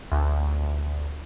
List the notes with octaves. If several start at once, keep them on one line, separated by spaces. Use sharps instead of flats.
D2